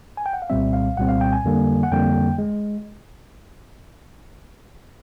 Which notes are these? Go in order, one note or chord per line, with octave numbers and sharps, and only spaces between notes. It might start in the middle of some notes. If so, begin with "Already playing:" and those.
G#5
G5
F#5
F5
C2 A#2 G3 C4 E5
F5
C2 A#2 G3 C4 F#5
F5
G5
G#5
F2 D3 G3 A#3
F#5
F2 D3 G3 A#3 G5
G#3